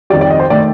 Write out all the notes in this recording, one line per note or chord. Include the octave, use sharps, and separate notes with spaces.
F2 D#3 G3 D5
D5
D#5
C5
D#3 A3 D5